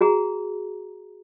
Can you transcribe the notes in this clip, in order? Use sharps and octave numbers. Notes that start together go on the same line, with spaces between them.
F#4 G#4 A#5